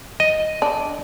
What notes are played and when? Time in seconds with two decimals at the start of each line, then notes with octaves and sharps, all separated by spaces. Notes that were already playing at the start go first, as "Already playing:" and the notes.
0.20 D#5
0.62 D4